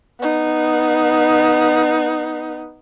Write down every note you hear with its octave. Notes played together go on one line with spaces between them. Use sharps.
B3 D#4